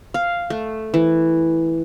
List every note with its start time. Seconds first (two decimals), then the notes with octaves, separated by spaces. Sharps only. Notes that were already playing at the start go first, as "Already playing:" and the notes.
0.14 F5
0.50 A3
0.94 E3